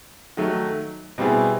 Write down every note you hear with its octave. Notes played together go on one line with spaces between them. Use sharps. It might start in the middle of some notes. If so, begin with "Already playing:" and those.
D#3 F#3 A3
B2 G3 C4 E4 G#4